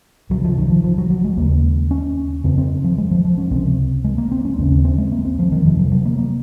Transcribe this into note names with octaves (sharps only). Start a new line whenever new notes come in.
C#2 C3 F#3
F3
D#3
F3
F3
F#3
F#3
G#3
D#2 C#3 A#3
C#4
F2 C#3 C4
C4
F3
G#3
F3
F3
C#4
C#2 C3 C4
G#3
A#3
C4
C#4
D#2 C#3 C4
C#4
C4
G#3
A#3
C4
F3
D#3
F2 C3 F3
F#3
F#3
A#3
A#3